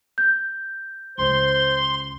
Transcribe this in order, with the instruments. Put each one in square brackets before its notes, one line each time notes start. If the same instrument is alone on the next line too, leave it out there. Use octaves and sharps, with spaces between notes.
[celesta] G6
[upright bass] C#2 C#3 [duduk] C5 [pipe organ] C6